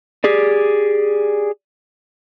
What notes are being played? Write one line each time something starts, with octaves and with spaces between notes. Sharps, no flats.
G4 G#4 D5